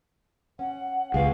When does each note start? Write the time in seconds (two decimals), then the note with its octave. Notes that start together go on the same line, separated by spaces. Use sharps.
0.59 C#4 F#5
1.14 C#2 B3 G#4 F5